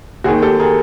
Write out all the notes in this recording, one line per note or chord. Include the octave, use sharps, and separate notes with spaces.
D#2 D#3 F#4 G#4
G4 A4
G#4 A#4